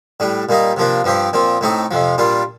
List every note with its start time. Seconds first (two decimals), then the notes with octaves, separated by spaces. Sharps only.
0.20 A2 G3 D4
0.49 A#2 G3 A#3 D#4
0.77 C3 F3 A#3 D4
1.04 G2 F3 C4 G4
1.33 A#2 F3 C4
1.61 A2 A3 C4 D#4
1.91 F2 C3 F3
2.18 A#2 G3 D4 F4